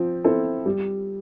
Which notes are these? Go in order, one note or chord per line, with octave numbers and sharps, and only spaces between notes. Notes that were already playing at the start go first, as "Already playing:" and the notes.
Already playing: F3 C4
C4 E4 A4
G3